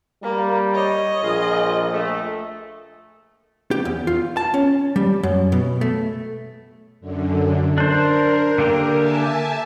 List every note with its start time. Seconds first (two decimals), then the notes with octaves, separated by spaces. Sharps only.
0.23 G3 A#3
0.75 C#5 D#5
1.23 A#1 F4 G#4
1.93 A3
3.71 G4
3.85 E2
4.07 F4
4.37 A5
4.54 C#4
4.96 G3
5.23 F#2
5.52 B2
5.81 A3
7.00 F#2 D3
7.78 D4 A#4 C5
8.58 D3 A#3 G4
8.97 E5 G#5 A5